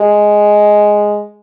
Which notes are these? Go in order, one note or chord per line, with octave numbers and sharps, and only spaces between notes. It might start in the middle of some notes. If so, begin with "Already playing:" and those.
Already playing: G#3